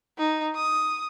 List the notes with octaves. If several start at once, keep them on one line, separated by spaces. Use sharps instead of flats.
D#4
D#6